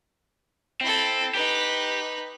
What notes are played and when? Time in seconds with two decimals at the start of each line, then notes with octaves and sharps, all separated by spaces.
0.81 C4 E4 A4
1.34 D#4 G4 B4